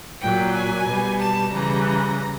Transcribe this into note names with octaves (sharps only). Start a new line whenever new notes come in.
A#2 F#3 G5
G#5
B2 G3
A5
C#3 E3 G3 A#5
A#5